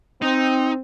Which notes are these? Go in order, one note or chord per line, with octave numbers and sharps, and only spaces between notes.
C4 D#4